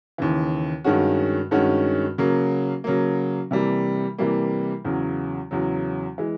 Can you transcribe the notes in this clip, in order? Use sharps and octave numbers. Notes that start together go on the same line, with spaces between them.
D#2 C#3 E3
G2 D#3 G#3 C#4 F#4
G2 D#3 G#3 C#4 F#4
C#3 F#3 A#3
C#3 F#3 A#3
C3 E3 G3 A#3
C3 E3 G3 A#3
E2 C#3 F#3
E2 C#3 F#3
E3 G#3